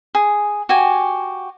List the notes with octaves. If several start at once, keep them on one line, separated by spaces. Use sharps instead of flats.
G#4
F#4 G4 G#5